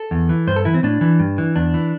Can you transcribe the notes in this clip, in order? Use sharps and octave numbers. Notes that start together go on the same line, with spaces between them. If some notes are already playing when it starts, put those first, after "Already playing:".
Already playing: A4
E2
E3
G2 C5
A4
E3 E4
C4
A2 D4
E3
G2
E3
E2 D4
E3